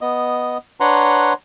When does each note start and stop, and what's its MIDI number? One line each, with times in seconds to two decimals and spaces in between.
0.01 0.58 59
0.01 0.58 75
0.80 1.33 62
0.80 1.33 71
0.80 1.33 73
0.80 1.33 78
0.80 1.33 82
0.80 1.33 84